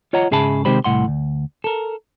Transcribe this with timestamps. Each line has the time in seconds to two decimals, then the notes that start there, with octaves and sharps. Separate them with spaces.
0.13 F4 C#5 D#5 F#5 A#5
0.31 G#2 C#3 G#4 E5 A5 B5
0.65 C3 D#3 G#3 G4 C5 B5
0.84 C2 A2 F#5 C6
1.08 D2
1.64 A4 A#4